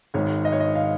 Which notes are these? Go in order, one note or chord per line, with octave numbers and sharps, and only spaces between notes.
G#1 G#2 D#3 C#5
D#5
C#5
D#5
F5